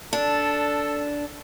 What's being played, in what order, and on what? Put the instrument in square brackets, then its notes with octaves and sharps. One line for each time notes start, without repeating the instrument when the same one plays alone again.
[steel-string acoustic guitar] D4 [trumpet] A4